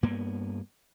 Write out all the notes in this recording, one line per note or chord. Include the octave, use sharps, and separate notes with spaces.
G2 A#3 B3